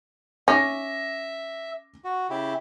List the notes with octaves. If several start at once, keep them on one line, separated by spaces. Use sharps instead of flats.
C#4 E5 D6 A#6
F#4
C#3 E4 G4